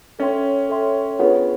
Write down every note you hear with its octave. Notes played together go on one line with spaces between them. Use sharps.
C#4 A4 C#5 E5 G5 C6
A4 C#5 E5 G5 C6
B3 D4 F4 G#4 C#5 F#5